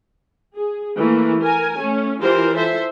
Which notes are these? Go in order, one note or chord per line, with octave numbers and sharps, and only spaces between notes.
G#4
E3 A3 A#3
A#4 G#5
A3 C#4
E3 F4 G4 A#4 C5
A4 C5 E5